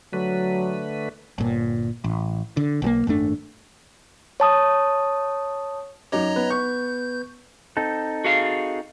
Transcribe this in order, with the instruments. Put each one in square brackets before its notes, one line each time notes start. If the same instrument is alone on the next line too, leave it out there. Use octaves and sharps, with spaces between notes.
[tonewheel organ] D3 A3 B4 [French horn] F#3
[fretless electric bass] G1 A#2
A1
D3
B1 E3 A#3
G#1 F#2 A3 D4
[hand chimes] C#5 A5 D#6
[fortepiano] F#2 D#4 D6 [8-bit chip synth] C#5 D#5 A#5
[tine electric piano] B3 B4
[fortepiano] C#6 [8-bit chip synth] G6
[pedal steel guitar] C4 D#4 A4
[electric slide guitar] F#4 G#4 F5